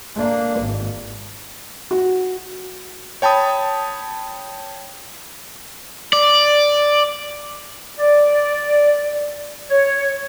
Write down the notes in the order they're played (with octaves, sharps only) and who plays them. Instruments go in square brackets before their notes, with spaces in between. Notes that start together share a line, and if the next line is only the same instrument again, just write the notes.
[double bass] A#3 D4
G#1
[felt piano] F#4
[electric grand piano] C#5 G5 A5 B5 D#6
[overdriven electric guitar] D5
[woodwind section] D5
C#5